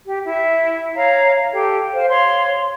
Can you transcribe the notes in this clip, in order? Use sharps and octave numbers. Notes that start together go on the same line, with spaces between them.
G4
E4 E5
C#5 F5 A#5
G4 A4 G5
C5 F5
C#5 F5 C6